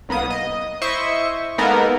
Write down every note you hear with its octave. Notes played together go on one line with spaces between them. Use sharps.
C2 A#3 B3 D#6
D#5
E4 C5 D#5 E5 C#6
G#3 A#3 B3 D#4 A4 A#4